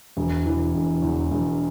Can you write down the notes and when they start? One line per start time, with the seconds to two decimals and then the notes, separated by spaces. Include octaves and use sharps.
0.17 E1
0.46 E3
0.75 E1
1.02 E2
1.31 E1